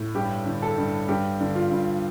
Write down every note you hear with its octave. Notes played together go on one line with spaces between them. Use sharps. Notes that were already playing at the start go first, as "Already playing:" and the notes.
Already playing: A2
G2 G4
D3
A4
G2
G2 G4
D3
F4
G2